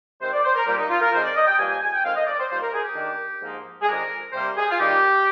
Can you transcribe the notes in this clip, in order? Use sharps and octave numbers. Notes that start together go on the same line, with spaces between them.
C3 D#3 G#3 C4 C5
D5
C5
A#4
A#2 G3 A#3 G4
D#4
F4
A#4
D#3 G#3 C4 D#4 C5
D5
D#5
G5
G2 F3 A#3 D4 G#5
G#5
G#5
G5
F2 D#3 G#3 C4 F5
D#5
D5
C5
G2 F3 A#3 D#4 C5
A#4
G#4
G4
D#3 A#3 D4
G#2 F3 A#3 D#4
G#4
F2 D#3 G#3 D4 A#4
C3 G3 A#3 C5
G#4
F4
D#3 G3 A#3 D#4 G4